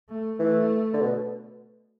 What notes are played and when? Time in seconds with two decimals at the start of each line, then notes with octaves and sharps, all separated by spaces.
0.09 A3
0.39 E3 A3
0.93 D3
1.01 B2